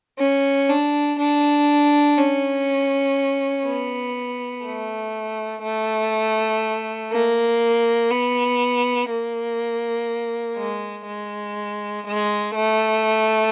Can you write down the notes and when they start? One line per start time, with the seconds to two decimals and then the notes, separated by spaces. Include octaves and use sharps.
0.19 C#4
0.69 D4
1.18 D4
2.17 C#4
3.66 B3
4.64 A3
5.63 A3
7.11 A#3
8.10 B3
9.09 A#3
10.57 G#3
11.07 G#3
12.06 G#3
12.55 A3